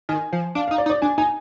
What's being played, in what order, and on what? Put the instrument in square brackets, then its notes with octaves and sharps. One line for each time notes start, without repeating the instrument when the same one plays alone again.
[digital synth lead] D#3 [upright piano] G#5
[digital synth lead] F3
[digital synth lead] D4 [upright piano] F5
[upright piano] F5
[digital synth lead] D#4
[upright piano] D5
[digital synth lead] D#4
[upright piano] D5
[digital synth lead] D4 [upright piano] G#5
[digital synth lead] D#4 [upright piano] G#5